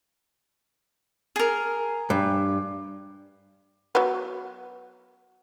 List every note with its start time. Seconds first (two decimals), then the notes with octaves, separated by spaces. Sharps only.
1.36 G#4 A#4
2.10 G2
3.95 F#3 B3